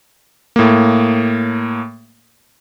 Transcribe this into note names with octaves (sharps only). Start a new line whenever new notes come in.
A2 A#3